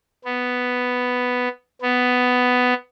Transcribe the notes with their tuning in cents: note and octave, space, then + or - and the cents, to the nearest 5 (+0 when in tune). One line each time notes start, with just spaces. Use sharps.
B3 +5
B3 +10